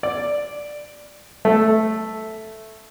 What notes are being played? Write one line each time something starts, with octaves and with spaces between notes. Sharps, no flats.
D5
A3